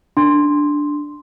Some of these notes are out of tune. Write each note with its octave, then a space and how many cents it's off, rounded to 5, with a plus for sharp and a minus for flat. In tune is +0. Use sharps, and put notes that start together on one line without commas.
D4 +0 C6 +0